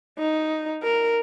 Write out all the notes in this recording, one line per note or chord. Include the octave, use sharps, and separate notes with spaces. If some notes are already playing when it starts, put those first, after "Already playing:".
D#4
A#4